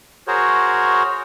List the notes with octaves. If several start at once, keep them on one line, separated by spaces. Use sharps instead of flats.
F#4 G#4 A#4 C5 C#5